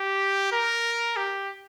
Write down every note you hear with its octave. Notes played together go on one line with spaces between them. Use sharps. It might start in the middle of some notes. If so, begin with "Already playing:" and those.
Already playing: G4
A#4
G4